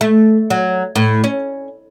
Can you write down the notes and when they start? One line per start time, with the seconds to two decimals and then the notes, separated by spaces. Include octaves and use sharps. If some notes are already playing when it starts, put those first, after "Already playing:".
0.01 A3
0.50 F#3
0.96 A2
1.24 C#4